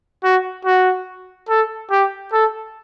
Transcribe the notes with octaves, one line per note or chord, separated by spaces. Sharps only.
F#4
F#4
A4
G4
A4